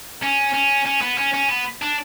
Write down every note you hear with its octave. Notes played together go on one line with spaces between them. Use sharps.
C#4
C#4
C#4
B3
C#4
C#4
B3
D4